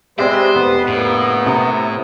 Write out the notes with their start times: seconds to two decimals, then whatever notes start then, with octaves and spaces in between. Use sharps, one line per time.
0.19 G#3 C4 G4 B4 C5 D5 E5
0.54 F1 B3
0.87 G1 A2 C#3 A#3
1.46 C3 D#6 C#7